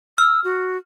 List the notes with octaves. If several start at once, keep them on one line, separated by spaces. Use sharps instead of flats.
E6 F6
F#4